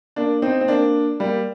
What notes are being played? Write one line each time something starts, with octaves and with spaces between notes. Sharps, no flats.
A#3 D4
C4 D#4
C4
A#3 D4
G3 A#3